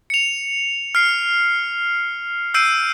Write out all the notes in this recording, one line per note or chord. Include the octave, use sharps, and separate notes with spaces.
C#7 F7
F6 C7
E6 G6 C7 D7 D#7